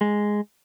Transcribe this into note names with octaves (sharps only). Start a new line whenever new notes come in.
G#3